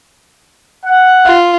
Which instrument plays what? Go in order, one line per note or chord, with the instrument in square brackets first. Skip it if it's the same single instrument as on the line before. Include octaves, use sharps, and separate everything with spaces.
[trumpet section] F#5
[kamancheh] F4